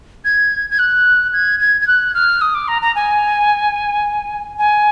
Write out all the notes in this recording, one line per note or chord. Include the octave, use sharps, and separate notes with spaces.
G#6
G#6
F#6
G#6
G#6
G#6
F#6
F6
D#6
D6
A#5
A#5
G#5
G#5